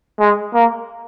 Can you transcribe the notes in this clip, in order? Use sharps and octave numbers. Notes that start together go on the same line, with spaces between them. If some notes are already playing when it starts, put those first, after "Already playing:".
G#3
A#3